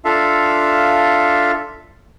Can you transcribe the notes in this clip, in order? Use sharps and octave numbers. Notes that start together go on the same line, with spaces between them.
D4 F4 A4 E5 F5